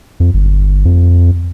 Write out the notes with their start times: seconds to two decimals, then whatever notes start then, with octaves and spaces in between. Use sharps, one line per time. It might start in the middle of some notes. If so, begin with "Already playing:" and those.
0.20 F2
0.34 G1
0.85 F2